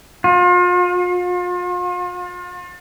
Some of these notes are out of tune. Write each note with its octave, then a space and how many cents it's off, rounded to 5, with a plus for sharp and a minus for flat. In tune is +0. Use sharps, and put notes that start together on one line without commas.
F4 +40